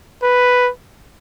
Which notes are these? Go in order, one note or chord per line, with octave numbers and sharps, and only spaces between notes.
B4